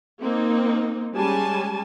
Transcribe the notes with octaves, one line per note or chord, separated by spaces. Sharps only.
A#3 C4 D#4
G3 G#3 C#4 G#5 A5